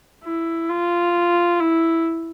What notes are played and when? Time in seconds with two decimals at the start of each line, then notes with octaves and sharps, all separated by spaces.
0.24 E4
0.69 F4
1.60 E4